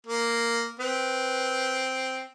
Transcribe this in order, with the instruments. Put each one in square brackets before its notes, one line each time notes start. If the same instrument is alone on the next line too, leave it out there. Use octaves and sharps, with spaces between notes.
[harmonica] A#3
[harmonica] C4 [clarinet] B4